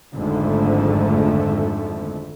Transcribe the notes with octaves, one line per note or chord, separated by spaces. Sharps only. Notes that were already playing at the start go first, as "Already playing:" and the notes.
G#1 F2 G#2 D3 A3